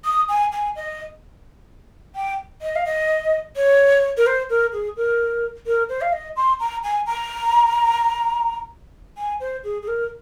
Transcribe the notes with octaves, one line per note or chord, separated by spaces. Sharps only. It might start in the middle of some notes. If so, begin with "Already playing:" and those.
D#6
G#5
G#5
D#5
G5
D#5
F5
D#5
C#5
A#4
C5
A#4
G#4
A#4
A#4
C5
F5
D#5
C6
A#5
G#5
A#5
G#5
C5
G#4
G#4
A#4